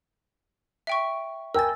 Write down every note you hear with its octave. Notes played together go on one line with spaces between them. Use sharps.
E5 G5 C#6
A#4 G5 G#5 E6 A6